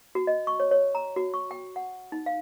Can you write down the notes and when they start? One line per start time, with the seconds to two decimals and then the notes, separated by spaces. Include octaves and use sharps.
0.15 F#4
0.27 D#5
0.47 C#6
0.60 C#5
0.71 C#5
0.95 A#5
1.16 F#4
1.34 C#6
1.51 G5
1.76 F#5
2.12 D#4
2.26 F5